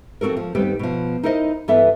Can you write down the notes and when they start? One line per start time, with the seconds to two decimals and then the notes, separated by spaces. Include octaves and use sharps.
0.21 F3 C4 F#4 A4 A#4
0.37 F3
0.55 G2 D#3 G3 B3 C4 G4
0.79 B2 F3
1.23 D#4 E4 A#4 C5 D#5
1.68 G2 E3 B3 A4 E5